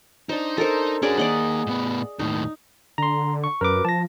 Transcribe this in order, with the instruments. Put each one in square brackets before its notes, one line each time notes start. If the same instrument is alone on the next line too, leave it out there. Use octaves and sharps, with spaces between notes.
[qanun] D4 C5 [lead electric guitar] D#4
[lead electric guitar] D#4 [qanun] A4 A#4 C5
[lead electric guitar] C#4 F#4 [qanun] D4 G#4 D5
[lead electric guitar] D#3 A#3 [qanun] D5 D#5 F#5
[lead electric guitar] A2 B3
[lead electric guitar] D#2 A2 [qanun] D#4
[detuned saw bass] D3 [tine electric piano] A#5 C6
[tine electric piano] C#6
[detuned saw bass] F#2 [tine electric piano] A#4 B4 D6
[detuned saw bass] F3 [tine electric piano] A5 A#6